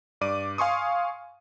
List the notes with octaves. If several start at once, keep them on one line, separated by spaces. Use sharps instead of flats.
G2 D5 D6 D#7
F5 G#5 C6 C#6 D#6